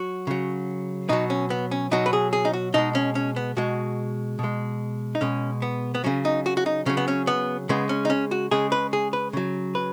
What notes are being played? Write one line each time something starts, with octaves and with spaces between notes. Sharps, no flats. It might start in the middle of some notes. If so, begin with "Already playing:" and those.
Already playing: F#3 F#4
C#3 F#3
B2 F#3 D#4
C#4
B3
C#4
B2 F#3 D#4
B4
G#4
G#4
D#4
F#4
B2 G#3 D#4
C#4
C#4
B3
B2 G#3 F#4
B2
G#3
D#4
B2 G#3 C#4
B3
B3
C#3 F#3 C#4
D#4
F#4
F#4
D#4
C#3 F#3 C#4
B3
C#4
B3
C#3 G#3 B3
C#4
D#4
C#4
F#4
C#3 G#3 G#4
B4
G#4
B4
C#3 F#3
B4